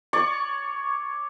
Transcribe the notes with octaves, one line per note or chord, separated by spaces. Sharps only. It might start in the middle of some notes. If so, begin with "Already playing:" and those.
C#5 D5 C#6